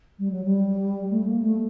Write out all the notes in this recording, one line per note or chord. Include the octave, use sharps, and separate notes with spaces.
G3
F#3
G3
A3
A#3
A3